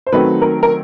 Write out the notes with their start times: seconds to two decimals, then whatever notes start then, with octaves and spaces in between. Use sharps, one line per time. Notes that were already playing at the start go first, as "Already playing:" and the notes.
0.07 C5
0.12 D#3 F#3 A3 C4 B4
0.42 A#4
0.63 A#4